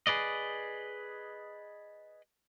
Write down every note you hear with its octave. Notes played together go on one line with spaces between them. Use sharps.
G#4 B4 D5 D#5